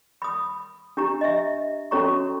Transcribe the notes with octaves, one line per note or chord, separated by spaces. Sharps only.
B5 D#6
D4 G4 A#5
D#5 E5
C#4 F#4 A4 C#5 A#5 C#6